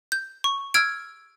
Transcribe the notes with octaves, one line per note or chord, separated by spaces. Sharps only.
G6
C#6
E6 F6 G#6 D7